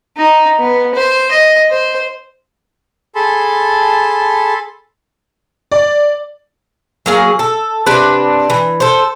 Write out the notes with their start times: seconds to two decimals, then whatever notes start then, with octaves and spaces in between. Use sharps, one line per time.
0.17 D#4
0.60 B3
0.95 C5
1.32 D#5
1.71 C5
3.15 G#4 A4 A5 B5 C6
5.72 D5
7.06 F#3 A#3 G#4
7.39 A4
7.86 C3 D4 B4
8.50 E3
8.80 A4 C5